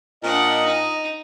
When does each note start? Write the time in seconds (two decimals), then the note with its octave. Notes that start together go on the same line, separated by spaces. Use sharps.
0.23 A#2 D4 D#5 F#5
0.65 D#4